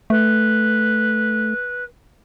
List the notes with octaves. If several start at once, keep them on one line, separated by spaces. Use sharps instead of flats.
A3 B4